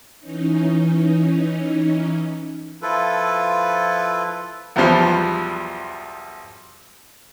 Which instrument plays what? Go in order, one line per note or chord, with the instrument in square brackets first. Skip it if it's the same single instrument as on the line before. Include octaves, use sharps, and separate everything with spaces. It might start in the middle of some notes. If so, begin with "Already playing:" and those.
[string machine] E3 C#4 D#4
[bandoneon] F3 E4 F4 A4 B4
[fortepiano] B1 E2 B2 F3 G3